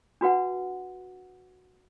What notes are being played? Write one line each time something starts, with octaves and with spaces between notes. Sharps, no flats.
D4 F#4 B4 F#5